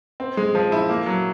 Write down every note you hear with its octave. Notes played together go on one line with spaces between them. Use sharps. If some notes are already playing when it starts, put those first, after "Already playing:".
C4
G#3
F3
E4
A#3
F#3